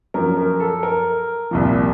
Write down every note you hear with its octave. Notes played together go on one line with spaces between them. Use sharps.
F#2 F3 A#4
A#4
A4
A#4
C2 A#2 F3